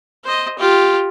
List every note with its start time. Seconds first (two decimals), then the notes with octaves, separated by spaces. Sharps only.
0.24 C5 D#5
0.58 F4 G4